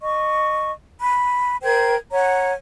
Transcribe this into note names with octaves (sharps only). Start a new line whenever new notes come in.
D#5 C#6
B5
A#4 C5 G5 G#6
C#5 F#5 A#5